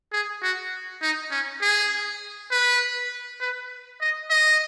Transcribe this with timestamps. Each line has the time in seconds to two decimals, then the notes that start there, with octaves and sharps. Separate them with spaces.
0.13 G#4
0.43 F#4
1.02 D#4
1.31 C#4
1.62 G#4
2.51 B4
3.40 B4
4.01 D#5
4.30 D#5